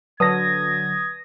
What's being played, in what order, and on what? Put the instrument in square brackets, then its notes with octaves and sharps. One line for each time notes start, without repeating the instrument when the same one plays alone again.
[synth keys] D3 F#3 [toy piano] B4 D5 A5 [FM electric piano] D#6 A#6 [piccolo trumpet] G#6